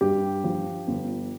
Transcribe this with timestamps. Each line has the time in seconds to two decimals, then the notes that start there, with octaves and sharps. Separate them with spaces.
0.01 G2 G4
0.44 F3
0.88 G1